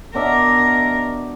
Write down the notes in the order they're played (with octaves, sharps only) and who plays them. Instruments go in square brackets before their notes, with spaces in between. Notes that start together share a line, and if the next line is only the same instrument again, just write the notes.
[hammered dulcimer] B2 D4 E5 [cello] A#4